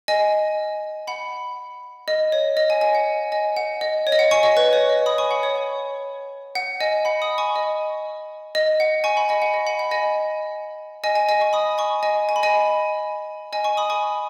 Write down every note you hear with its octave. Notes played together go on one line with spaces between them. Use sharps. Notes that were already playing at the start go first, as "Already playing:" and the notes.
D#5 G#5
F#5 B5
D#5
C#5
D#5
D#5 G#5
D#5 G#5
F#5
D#5 G#5
F#5
D#5
C#5
D#5
F#5
G#5 C#6
D#5
B4
C#5
D#5
B5 D#6
G#5 C#6
F#5 B5
C#5
C#5
F#5
D#5 G#5
F#5 B5
B5 D#6
G#5 C#6
D#5
D#5
F#5
G#5 C#6
F#5 B5
D#5 G#5
F#5
D#5 G#5
F#5 B5
F#5
D#5 G#5
D#5 G#5
D#5 G#5
D#5 G#5
G#5 C#6
B5 D#6
G#5 C#6
D#5 G#5
G#5
B5
D#5 G#5
D#5 G#5
G#5 C#6
B5 D#6
G#5 C#6